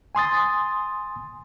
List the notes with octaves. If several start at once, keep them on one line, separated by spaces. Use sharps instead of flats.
G#5 C6 D#6 A6